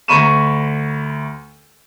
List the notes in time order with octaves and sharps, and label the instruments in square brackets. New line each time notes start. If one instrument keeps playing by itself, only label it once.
[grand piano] D2 A#5 B5 C#6 D#7 E7